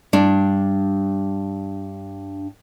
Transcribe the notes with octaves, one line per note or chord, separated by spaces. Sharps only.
G2 D4